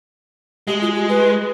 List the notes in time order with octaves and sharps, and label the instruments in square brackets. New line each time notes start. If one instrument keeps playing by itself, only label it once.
[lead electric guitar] G#3 [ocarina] G4
[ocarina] F4
G4
B4